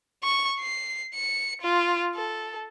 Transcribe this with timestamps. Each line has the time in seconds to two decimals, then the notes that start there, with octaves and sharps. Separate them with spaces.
0.24 C#6
0.60 C7
1.15 C#7
1.62 F4
2.15 A4